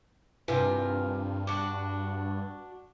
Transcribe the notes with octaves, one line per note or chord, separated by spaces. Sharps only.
G2 C3 E4 F4 A#4 B4 G#5
D4 F#4 D6